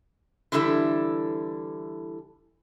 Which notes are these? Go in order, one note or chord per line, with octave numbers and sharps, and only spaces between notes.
D3 E3 G3 D4 E4 A4